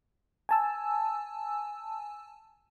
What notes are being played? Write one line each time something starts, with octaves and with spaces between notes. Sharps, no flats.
G#5 A5 E6